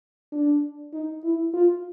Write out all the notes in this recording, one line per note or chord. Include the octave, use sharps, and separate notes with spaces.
D4
D#4
E4
F4